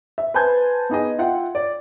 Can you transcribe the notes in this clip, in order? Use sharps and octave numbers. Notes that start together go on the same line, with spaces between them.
E5
B4 C5 G#5 A5 G6 G#6
B3 D#4 G#4 D#5
F4 E5 F#5 G5
D5